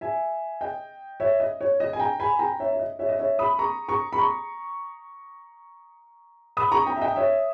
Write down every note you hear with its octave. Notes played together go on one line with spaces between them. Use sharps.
E5 G#5
D#5 G5
C#5 E5
D#5
C#5
D#5
G#5
G5 A#5
G#5 B5
G5 A#5
C#5 E5
E5
D#5
C#5 E5
D#5
C#5 E5
B5 D#6
A#5 C#6
A#5 C#6
B5
A#5 C#6
B5 D#6
A#5 C#6
G5 A#5
E5
D#5 G5
C#5 E5